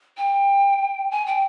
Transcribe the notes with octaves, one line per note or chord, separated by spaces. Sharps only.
G5
G#5
G5